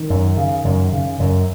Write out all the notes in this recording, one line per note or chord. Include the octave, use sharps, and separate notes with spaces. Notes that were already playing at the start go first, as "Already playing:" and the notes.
Already playing: D#3
F#2
C#3
F#2
C#3
F#2